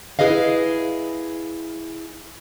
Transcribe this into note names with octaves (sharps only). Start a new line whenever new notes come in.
E4 G#4 B4 D#5 F5